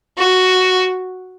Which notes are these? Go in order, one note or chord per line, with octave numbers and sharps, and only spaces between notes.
F#4